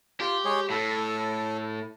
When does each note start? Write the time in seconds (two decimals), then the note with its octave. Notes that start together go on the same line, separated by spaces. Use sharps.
0.20 F4 G4
0.45 G#3 G#4 C#5
0.70 A2 A4